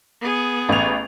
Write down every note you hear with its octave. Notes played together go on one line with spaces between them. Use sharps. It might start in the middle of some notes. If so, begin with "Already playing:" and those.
B3 G#4
A1 F7